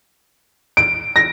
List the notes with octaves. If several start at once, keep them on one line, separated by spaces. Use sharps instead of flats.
D7
A#6